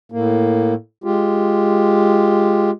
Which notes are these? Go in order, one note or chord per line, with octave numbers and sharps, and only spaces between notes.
A2 A#3
G#3 F4 G4